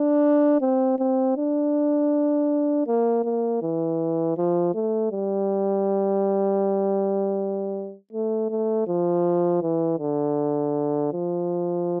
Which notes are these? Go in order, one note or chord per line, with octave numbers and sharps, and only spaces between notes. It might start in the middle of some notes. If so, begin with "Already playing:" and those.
Already playing: D4
C4
C4
D4
A#3
A#3
E3
F3
A3
G3
A3
A3
F3
E3
D3
F3